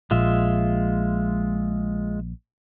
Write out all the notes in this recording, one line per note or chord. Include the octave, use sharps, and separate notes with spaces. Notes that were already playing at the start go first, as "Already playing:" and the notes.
A#1 G#3 F4 E5